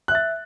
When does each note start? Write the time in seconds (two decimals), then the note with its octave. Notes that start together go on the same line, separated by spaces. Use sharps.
0.08 F#6
0.12 E5
0.15 A6